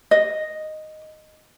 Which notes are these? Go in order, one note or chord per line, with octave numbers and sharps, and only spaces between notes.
D#5